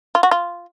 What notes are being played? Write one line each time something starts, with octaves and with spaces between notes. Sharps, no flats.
F4
F#4
F4